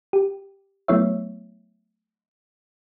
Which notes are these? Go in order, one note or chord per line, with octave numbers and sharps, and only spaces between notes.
G4
F#3 A3 B3 E4 C#5 E5